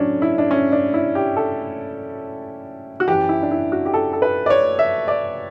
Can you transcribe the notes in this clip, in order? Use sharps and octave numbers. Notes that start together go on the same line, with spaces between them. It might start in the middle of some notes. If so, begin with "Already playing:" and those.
Already playing: A2 F#3 C#4 D4
E4
D4
C#4
D4
E4
G4
A4
F#4
F#2 E3 G4
E4
D4
E4
F#4
G4
A4
A4
B4
D5
C#5
E5
D5